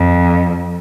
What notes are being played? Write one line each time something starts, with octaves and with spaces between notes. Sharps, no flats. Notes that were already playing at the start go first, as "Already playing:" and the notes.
Already playing: F2